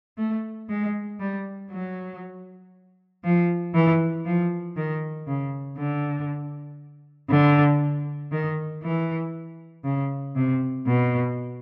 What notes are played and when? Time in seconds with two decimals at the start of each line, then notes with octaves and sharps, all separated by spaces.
0.18 A3
0.69 G#3
1.20 G3
1.71 F#3
3.24 F3
3.74 E3
4.25 F3
4.76 D#3
5.27 C#3
5.77 D3
7.30 D3
8.32 D#3
8.83 E3
9.84 C#3
10.35 C3
10.86 B2